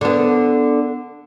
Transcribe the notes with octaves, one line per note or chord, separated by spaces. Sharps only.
D3 B3